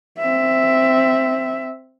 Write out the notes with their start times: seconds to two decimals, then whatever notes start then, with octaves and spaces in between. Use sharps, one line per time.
0.19 C4 E5